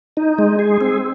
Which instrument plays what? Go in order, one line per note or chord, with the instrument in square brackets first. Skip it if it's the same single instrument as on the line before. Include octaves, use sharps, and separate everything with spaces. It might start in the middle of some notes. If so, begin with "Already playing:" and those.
[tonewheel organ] D#4
G#3
G#4
C4